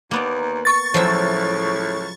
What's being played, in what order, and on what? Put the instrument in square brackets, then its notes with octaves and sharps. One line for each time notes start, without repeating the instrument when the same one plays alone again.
[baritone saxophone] D#2 [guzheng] A#3 B3 D5
[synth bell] C#6 A6
[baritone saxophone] C#2 [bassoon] A2 [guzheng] F3 F#3 E5